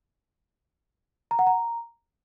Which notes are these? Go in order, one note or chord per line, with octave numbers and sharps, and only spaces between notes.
A#5
F#5
A#5